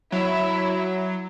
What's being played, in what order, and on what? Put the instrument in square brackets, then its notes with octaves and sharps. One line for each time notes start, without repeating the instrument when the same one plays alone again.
[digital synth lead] F#3 [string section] E4